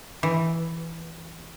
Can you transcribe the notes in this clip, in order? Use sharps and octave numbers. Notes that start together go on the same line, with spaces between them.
E3